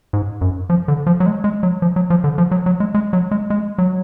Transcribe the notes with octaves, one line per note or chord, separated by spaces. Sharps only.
G#2
F#2
F3
D3
F3
F#3
G#3
G#3
F#3
F3
F#3
F3
D3
F3
F#3
F#3
G#3
G#3
F#3
G#3
G#3
F#3